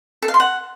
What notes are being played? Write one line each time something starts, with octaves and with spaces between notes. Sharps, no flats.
A4
F5
C6
F#5